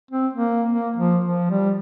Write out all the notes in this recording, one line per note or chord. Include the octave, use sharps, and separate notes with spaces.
C4
A#3
A#3
F3
F3
G3